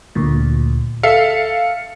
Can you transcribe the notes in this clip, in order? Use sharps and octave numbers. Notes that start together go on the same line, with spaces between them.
D2 A#2
A4 E5 F5 C#7